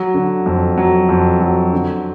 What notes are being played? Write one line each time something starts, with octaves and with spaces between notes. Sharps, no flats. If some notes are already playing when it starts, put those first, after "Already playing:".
Already playing: F#3
D3
F2
F#3
F2
F#3
D3